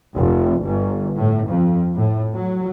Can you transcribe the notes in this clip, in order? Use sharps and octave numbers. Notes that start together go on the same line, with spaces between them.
F1
G1
A2
F2
A2
F#3